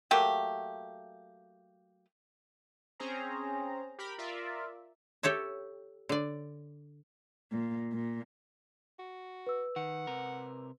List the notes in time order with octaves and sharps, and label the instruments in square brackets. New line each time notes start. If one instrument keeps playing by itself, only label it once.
[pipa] F#3 A3 A#3 G4
[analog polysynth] C4 C#4 G#4 C5 A#5
G4 A#4 B5
F4 A#4 D5 E5
[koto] G4 A4 C#5 E5
D3 D5
[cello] A#2
A#2
[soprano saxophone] F#4
[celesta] B4 E6
[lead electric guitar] D#3 [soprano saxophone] F#5
[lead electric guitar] C3 A#4